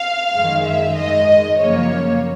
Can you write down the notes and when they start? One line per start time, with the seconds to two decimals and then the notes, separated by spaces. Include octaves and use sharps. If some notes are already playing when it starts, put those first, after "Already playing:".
Already playing: F5
0.33 F#2 D#3 G#3
0.64 E5
0.96 G#2 D#3 G#3 D#5
1.59 F#2 C#3 F3 A#3 C#5